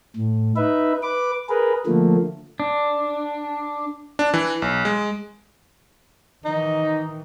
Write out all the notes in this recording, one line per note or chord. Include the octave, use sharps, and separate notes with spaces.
A2
D#4 B4 E5
B4 D6
G#4 A#4 B4
D3 F3 A3 A#3
D4
D4
E3
B1
G#3
D#3 E3 D#4